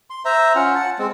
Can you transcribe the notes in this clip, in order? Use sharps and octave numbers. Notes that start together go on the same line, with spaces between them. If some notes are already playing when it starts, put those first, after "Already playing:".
C6
C5 E5 A#5
C#4 F4 F#5
F#5 A5
G#3 C4